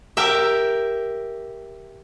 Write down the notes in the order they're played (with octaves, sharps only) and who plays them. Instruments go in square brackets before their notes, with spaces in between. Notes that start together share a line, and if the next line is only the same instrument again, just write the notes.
[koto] G4 A#4 E5